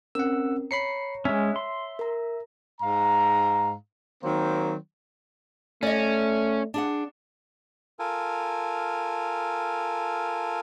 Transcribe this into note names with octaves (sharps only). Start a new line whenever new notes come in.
C4 C#4 A#4 F#5 E6
C#5 A#5 B5 C7 C#7
G#3 C#4 E5
C6
A#4 A#5
G#2 F5 A#5
D#3 F#3 A#3 C4 C5
A3 C#4 D5 D#5
D4 G#4 F#5
F4 A4 A#4 G#5